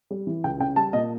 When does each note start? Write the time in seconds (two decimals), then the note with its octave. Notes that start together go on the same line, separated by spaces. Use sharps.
0.11 G3
0.27 E3
0.44 C#2 G5
0.60 C#3 G5
0.76 G3 A5
0.93 A#2 D#5